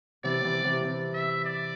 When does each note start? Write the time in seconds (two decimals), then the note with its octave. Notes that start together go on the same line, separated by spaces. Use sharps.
0.24 C3 E3 D5
0.44 C3 E3
0.64 C3 E3
0.84 C3
1.14 E5
1.45 D5